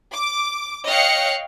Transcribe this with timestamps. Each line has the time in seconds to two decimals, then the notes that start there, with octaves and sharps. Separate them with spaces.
0.14 D6
0.86 C#5 D#5 F5 G5 F#6 C#7